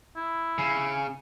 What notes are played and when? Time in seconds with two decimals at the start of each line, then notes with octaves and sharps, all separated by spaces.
0.16 E4
0.58 C#3